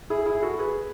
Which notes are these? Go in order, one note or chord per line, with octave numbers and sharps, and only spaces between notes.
E4 G#4
E4 G#4
F#4 A4
G#4 B4